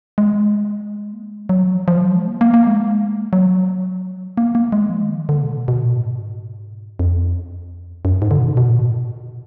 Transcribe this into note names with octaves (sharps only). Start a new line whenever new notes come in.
G#3
A#3
G#3
F#3
F3
F3
F#3
G#3
A#3
A#3
A#3
G#3
F#3
A#3
A#3
G#3
F3
D#3
D3
B2
B2
A#2
G#2
F2
F#2
G#2
D3
B2
B2
A#2
G#2
A#2